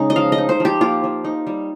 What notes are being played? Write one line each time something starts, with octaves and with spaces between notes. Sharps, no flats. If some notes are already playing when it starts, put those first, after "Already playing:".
Already playing: C#3 G#3 D#4
D#5
F3 F5
D#5
D#4
C5
F3 G4
A#3 F4
F3
D#4
G3